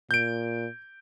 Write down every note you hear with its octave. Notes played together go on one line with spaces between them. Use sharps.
A#2 G6 D7